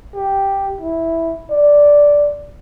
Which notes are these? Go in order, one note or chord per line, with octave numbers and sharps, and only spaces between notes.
G4
E4
D5